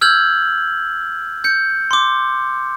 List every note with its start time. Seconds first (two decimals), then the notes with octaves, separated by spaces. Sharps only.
0.01 E6 F6 G6 G#6 F#7
1.44 G6 C#7
1.91 C6 D6